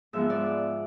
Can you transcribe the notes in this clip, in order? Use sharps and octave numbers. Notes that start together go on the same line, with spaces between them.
G#2 F3 G#3 B3 E5
D5